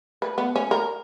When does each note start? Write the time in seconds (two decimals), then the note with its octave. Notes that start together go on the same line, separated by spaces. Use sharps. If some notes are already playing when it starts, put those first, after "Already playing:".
0.22 B4
0.38 B3
0.56 C#4
0.71 A#4